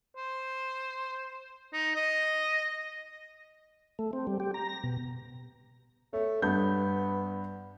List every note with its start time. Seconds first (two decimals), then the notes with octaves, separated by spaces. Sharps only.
0.16 C5
1.73 D#4
1.96 D#5
3.99 A3
4.13 C4
4.27 G3
4.40 G4
4.54 A#5
4.69 A#6
4.84 B2
6.13 A3 C#5
6.42 G2 B3 G6